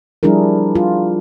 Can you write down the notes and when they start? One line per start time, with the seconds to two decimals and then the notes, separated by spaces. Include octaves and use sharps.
0.23 F3 G3 D4 E4 G#4 A#4
0.75 F4